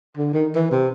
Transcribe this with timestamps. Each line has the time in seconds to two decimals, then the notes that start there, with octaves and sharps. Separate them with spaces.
0.17 D3
0.34 D#3
0.55 E3
0.71 C3